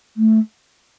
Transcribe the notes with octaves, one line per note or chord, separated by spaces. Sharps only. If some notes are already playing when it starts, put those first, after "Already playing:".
A3